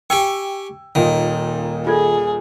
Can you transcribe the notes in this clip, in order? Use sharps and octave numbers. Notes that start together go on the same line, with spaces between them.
G4 G5 G#5 C#6 E6
D#1 A#2 D#3 D#5
F4 G#4 A4 D5